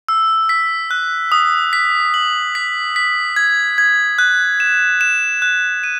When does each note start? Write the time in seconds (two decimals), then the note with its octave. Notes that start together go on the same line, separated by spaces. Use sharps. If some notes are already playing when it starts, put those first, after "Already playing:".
0.08 E6
0.49 B6
0.91 F#6
1.32 D#6
1.73 B6
2.14 F#7
2.55 B6
2.96 B6
3.36 G#6
3.78 G#6
4.19 F#6
4.60 E7
5.01 E7
5.42 F#6
5.84 D#7